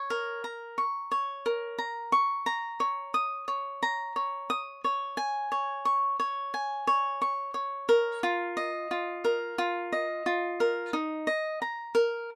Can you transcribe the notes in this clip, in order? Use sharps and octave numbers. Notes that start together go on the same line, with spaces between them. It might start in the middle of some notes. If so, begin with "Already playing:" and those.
Already playing: C#5
A#4
A#5
C#6
C#5
A#4
A#5
C#6
A#5
C#5
D#6
C#5
A#5
C#5
D#6
C#5
G#5
C#5
C#6
C#5
G#5
C#5
C#6
C#5
A#4
F4
D#5
F4
A#4
F4
D#5
F4
A#4
D#4
D#5
A#5
A#4